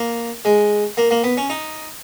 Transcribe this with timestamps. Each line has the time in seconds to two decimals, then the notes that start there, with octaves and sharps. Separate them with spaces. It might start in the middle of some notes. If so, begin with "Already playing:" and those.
Already playing: A#3
0.45 G#3
0.97 A#3
1.11 A#3
1.24 B3
1.37 C#4
1.50 D#4